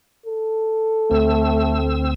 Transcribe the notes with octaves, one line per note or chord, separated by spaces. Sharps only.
A4
D2 A3 C4 E6